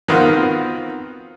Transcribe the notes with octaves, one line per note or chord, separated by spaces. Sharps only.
D#3 B3 C4 F4 F#4